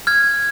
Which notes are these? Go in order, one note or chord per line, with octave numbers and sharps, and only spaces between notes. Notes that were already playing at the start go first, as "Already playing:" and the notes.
F6 G#6